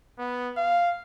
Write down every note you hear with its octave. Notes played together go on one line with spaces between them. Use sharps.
B3
F5